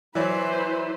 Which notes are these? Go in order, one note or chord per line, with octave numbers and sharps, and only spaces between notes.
E3 F#3 E4 B4 C5 D5 E5